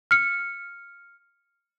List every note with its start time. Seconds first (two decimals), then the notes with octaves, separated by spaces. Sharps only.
0.11 F6 C#7